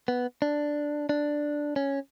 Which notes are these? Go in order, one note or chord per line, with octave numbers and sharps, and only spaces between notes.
B3
D4
D4
C#4